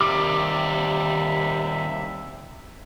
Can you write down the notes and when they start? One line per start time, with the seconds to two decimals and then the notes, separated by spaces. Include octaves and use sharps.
0.01 D#2 C3 D#3 G3 G4 E5 D6